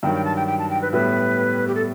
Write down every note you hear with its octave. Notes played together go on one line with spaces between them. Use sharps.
G2 D#3 F#3 G5
G5
A5
G5
G5
A5
G5
B4
A2 G3 B3 B4
G4
A4